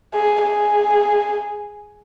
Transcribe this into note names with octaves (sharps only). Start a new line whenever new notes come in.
G#4
G#4